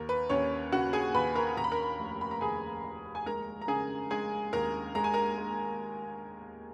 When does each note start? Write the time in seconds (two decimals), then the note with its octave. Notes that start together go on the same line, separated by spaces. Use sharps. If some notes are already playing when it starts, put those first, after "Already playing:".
Already playing: D#2 A#4
0.09 B4
0.29 D#2 C#4 C#5
0.72 C#3 F#4 F#5
0.93 G#4 G#5
1.14 D#2 B4 B5
1.35 A#4 A#5
1.57 D#2 A#5
1.64 B5
1.72 A#4 A#5
1.99 F1
2.21 B5
2.31 A#5
2.41 D#2 G#4 G#5
2.83 F1
3.15 G#5
3.26 G#3 A#4 A#5
3.62 A#5
3.68 C#3 G#4 G#5
4.11 G#3 G#4 G#5
4.53 D#2 A#4 A#5
4.95 G#3 A#5
5.04 G#5
5.14 A#4 A#5
5.38 G#3